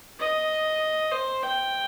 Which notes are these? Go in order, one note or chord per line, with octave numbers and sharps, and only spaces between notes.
D#5
C5
G5